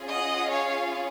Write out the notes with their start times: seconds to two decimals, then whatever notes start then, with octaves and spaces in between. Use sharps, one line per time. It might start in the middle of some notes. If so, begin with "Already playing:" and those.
Already playing: C#4 F4 G#4
0.08 D#5 F#5
0.50 C#5 F5